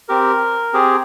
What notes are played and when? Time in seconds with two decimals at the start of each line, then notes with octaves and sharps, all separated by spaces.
0.08 C4 G4 A#4
0.73 C4 G4 G#4